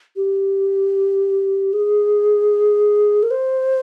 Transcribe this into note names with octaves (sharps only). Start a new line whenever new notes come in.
G4
G#4
A#4
C5